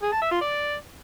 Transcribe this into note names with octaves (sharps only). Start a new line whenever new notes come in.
G#4
A5
E5
F4
D5